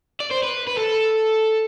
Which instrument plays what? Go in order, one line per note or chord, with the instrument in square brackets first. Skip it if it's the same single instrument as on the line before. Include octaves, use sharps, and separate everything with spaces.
[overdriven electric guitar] D5
C5
B4
B4
A4